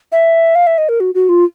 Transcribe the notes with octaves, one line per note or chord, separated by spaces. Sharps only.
E5
F5
E5
D#5
A#4
F#4
F#4
F4